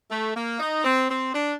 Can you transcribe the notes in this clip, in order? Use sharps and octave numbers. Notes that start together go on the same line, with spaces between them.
A3
A#3
D#4
C4
C4
D4